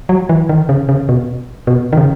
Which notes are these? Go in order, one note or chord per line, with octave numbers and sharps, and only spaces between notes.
F#3
E3
D#3
C#3
C#3
B2
B2
D#3
C#3